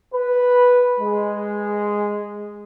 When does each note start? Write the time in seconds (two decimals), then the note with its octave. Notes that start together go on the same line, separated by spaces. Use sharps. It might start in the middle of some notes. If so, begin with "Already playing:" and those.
0.14 B4
1.00 G#3